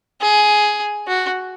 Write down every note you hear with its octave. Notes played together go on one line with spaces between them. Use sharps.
G#4
F#4